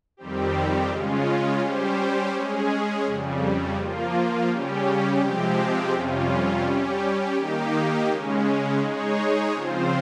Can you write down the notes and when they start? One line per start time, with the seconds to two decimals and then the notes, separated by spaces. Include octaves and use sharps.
0.17 F2 D#3 G3 C4 G4
0.89 C#3 G#3 C#4 F4
1.61 G3 C#4 G4 C5
2.32 G#3 C#4 G#4
3.05 F2 C#3 G3
3.76 F3 A#3 F4
4.48 C#3 G3 C#4 G4
5.20 C3 F3 G#3 C4 G4
5.92 F2 C3 G3 C#4 F4
6.64 G3 C#4 G4
7.36 D#3 A#3 D#4 G4
8.08 C#3 G#3 C#4
8.80 G#3 D#4 G#4 C#5
9.52 C#3 F3 C4 F4 C5